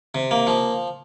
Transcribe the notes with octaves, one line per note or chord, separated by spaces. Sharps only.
C3
A#3
F3